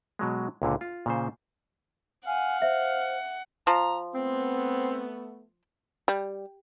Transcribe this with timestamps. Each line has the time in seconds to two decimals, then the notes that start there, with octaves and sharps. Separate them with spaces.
0.19 B2 F#3 G#3
0.62 C#2 A#2 D3
0.81 F4
1.06 A#2 C#3 C5
2.27 F5 F#5 G#5
2.62 C5 E5
3.67 F3 A#5
4.14 A3 B3 C4
6.08 G3